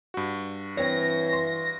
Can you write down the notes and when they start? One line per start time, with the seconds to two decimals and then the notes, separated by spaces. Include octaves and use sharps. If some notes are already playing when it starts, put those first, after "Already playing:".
0.14 G2 F#4
0.77 E3 C4 C#5 A#6
1.33 C6